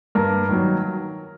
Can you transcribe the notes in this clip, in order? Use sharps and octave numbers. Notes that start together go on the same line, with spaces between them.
G2 A#4
D#3 F#3